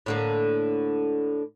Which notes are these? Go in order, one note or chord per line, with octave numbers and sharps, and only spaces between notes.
A2 D3 A#3